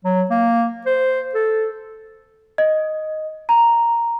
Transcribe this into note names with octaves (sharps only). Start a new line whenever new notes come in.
F#3
A#3
C5
A4
D#5
A#5